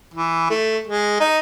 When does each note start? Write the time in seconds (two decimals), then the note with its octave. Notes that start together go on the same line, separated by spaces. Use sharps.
0.14 E3
0.50 A3
0.87 G#3
1.20 D#4